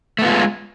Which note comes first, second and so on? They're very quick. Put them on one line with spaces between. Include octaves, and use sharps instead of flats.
A3 B3 F4 G#3